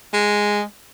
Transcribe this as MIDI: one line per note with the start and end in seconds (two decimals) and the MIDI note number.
0.13 0.62 56